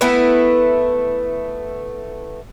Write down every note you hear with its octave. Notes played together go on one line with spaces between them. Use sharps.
A3 B3 E4 B4